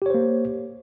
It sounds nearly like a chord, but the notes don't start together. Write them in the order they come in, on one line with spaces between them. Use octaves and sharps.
G4 C#5 C5 A#3